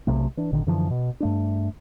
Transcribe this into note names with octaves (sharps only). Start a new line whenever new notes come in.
B1 C3 A3
E3 D4
G#1 A#2 D3 D#3
F#2 D3 E3 F3
B2
G2 A3 D4